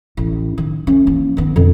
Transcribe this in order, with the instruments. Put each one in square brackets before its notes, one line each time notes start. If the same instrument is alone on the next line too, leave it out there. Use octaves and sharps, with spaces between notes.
[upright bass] A1
D#3
A3 C#4
E3 A#3
D#3 B3
F2 D3